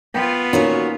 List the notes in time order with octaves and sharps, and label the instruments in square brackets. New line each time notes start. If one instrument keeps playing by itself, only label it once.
[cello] B3 F4 [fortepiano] G5
[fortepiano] A#2 D#3 C#4 [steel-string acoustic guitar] F#4 A#4 C#5